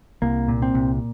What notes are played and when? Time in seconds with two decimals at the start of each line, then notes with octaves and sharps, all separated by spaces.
0.22 C2 A#3
0.48 A#2
0.62 C4
0.74 C2